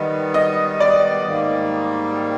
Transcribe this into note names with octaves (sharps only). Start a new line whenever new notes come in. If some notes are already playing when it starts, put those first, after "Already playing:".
Already playing: D#3 G3 B3 D#5
D#5
D5
G#2 D#3 G3 A#3